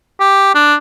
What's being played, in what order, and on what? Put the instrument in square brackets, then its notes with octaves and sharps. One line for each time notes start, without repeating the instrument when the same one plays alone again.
[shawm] G4
D4